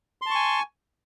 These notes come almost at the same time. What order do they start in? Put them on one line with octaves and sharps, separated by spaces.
C6 A5 C#6 G#5